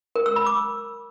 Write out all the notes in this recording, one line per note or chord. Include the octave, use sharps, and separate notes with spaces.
A#4
E6
B5
D6